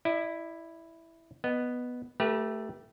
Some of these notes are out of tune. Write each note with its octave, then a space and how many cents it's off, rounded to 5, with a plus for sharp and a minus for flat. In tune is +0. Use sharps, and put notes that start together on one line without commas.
E4 +0 D5 +45
B3 +0 D#5 -15
A3 +0 G4 +0 B4 -40